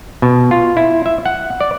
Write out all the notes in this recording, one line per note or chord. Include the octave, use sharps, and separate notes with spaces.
B2
F4
E4
E5
F#5
D5